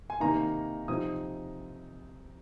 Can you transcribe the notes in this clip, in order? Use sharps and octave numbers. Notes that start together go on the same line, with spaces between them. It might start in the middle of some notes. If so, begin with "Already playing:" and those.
G#5
C3 D#3 A#3 D#4 A#5
C3 F3 C4 D#4 D#6